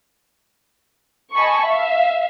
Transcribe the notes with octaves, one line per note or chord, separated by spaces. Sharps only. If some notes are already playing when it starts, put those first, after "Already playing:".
D#5 G#5 A5 B5 C#6
E5 F5